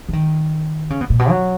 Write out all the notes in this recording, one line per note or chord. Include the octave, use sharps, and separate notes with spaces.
E3
D#3
C#3
B2
A#2
B2
F#3